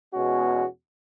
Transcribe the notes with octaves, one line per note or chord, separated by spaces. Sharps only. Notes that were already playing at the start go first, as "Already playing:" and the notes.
E2 B2 G#3 C#4 F#4